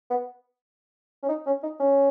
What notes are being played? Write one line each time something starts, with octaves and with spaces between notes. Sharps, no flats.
B3
C#4
D#4
C#4
D#4
C#4